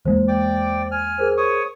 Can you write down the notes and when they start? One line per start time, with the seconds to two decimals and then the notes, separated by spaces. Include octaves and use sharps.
0.05 E2 G#3 A#3 C5
0.28 D5 G5 D6
0.91 G#5 F6
1.18 G#4 A#4 C5
1.37 C#5 C#6 D#6